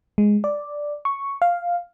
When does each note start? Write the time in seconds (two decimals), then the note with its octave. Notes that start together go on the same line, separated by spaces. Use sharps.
0.18 G#3
0.44 D5
1.05 C#6
1.42 F5